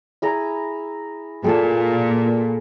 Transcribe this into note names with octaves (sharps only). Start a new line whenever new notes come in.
E4 G#4 A#5
A#2 G#4 A4 A5